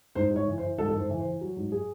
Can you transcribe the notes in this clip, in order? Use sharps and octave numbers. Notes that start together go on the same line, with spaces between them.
G#2 C5
G#2
C#5
E3
C5
E3
G#2 A4
A4
G#2
C5
E3
C5
E3
F#3
G#2
G#4